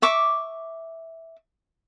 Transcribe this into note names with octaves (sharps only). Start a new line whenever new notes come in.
E5 C#6 D6